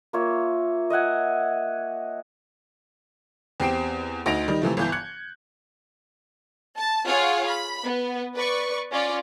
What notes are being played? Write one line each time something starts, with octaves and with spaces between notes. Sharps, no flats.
A#3 F4 C#5 E5
D#5 E5 F#5 G#5
E2 C4 G4 C7 D7 E7
D2 D#4 A#6 D7 F7
D#3 G3 D#4
C3 E3 F3 A3
G1 E3 G6
F#6 G#6 C#7
A5
F4 G#4 C#5 F5 F#5
B5
B3 B4
B4 D5 C#6
C#4 F4 C#5 D5